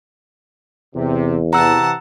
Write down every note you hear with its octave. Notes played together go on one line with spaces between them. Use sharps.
E2 C3
C3 E3 F#5 A5 A#5 E6